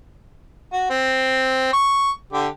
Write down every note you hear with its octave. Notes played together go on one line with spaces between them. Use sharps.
F#4
C4
C#6
D3 G4